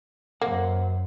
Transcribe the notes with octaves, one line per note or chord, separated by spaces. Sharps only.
F#2 A#3 C5 F#5